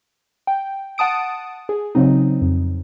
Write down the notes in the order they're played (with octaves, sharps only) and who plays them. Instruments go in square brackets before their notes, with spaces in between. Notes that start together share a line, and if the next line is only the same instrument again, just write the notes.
[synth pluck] G5
F#5 A5 D#6 D7
G#4
C#3 F#3 C4 D#4
F2